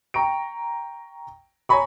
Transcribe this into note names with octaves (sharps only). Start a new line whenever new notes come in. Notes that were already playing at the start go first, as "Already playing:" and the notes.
G5 A#5 C#6 D7
C#5 G#5 A#5 B5 C#6